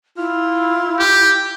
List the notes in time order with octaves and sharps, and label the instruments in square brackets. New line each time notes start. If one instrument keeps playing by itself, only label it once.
[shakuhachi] E4 [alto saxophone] F4
[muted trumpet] G4